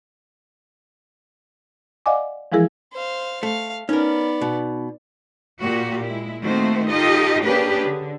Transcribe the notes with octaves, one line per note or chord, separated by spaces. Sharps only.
D5 D#5 F5 F#5 G#5 D6
E3 F3 G#3 E4 G#4 A#4
C5 F5
A3 F5
B3 C#4 D#4 A#4 D5
B2
A#2 F#4 G4
G#3 E4
D#3 A3 A#3 C4 F#4 C5
D#4 F4 G4 A4 D#5
A#3 C#4 D4 G4 G#4 B4
D3